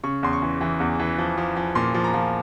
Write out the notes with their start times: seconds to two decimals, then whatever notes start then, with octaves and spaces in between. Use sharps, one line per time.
0.04 C#3 C#6
0.23 E2 C6
0.33 C#6
0.42 E3
0.61 E3
0.80 E2
0.99 E3
1.18 F3
1.38 F3
1.57 F3
1.75 A#2 C6
1.94 F3
2.04 A#5
2.14 F3